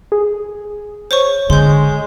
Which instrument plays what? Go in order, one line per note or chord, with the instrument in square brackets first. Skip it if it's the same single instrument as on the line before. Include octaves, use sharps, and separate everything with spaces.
[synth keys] G#4
[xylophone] C5 C#5 C#6
[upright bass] D3 [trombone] G#3 [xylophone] C6 G6